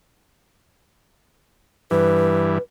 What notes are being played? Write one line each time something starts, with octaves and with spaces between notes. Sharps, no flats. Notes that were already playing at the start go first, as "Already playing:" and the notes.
G2 E3 B4